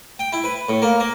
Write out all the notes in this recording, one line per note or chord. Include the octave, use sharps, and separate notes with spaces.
G5
E4
B4
A2
A#3
A#3